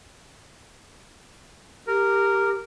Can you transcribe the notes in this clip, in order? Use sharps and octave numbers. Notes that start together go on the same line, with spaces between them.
G4 A#4